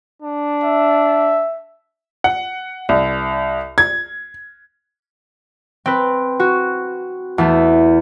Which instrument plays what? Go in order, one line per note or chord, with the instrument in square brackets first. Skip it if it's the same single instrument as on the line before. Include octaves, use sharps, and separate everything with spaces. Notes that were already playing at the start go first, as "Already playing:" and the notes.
[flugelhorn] D4
[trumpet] E5
[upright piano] F#5
C2
G#6
[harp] C4 B4
F#4
E2 A3